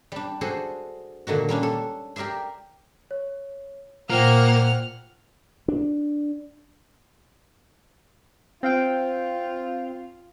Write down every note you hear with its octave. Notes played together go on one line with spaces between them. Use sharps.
G3 D4
D4 F#4 G#4 A4 C5
A#2 D3 D#3 F#4
G3 A#3 C#4 D4
A4
G4 A#4 D5 E5 C6
C#5
A#2 A#3 F4 C5 F#5 G5 F6
D4
C4 F4 F5 G5